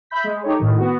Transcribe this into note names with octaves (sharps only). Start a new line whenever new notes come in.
E5 B5 G6 B6
G#3
D#4 G4 A4 C#5
A2 D#3
B3 F#4